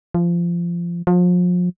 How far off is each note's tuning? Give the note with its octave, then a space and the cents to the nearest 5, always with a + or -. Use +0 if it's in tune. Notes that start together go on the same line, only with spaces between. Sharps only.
F3 -20
F3 +35